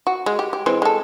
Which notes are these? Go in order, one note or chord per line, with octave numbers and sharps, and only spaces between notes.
F#4
G#3
G4
G4
E3 G#3 C4
G#3 A4